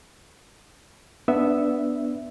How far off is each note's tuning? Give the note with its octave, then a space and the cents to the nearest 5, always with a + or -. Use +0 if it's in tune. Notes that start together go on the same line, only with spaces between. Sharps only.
B3 +0 D4 +0 E5 +0